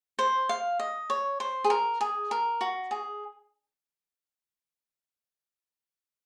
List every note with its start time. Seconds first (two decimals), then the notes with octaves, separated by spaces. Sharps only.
0.19 C5
0.49 F5
0.80 D#5
1.10 C#5
1.40 C5
1.64 G#4
1.70 A#4
2.01 G#4
2.31 A#4
2.61 F#4
2.91 G#4